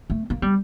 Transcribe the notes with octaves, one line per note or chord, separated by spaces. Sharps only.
A3
A#3
G3